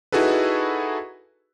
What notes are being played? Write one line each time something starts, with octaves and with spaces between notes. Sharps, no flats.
D#4 E4 F#4 G#4 A4 B4